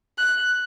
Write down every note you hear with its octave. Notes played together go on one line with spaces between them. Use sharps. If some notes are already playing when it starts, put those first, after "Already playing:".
F#6